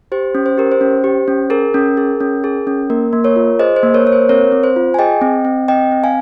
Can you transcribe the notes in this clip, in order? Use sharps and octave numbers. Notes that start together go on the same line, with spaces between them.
G4 C5
C#4
C5
G4 A#4
C5
C#4
G4
C#4
G#4 A#4
C#4
G#4
C#4
G#4
C#4
A#3 A#4
A#3
A#4 C#5
F4
G#4 C5 D#5
C5
A#3
A#4 C#5
A#3 C#5
C5
C4 A#4 C#5
C4
C5
F4
G#5
G#4 D#5 G5
C4
C4
C4 D#5 G5
C4
F5 G#5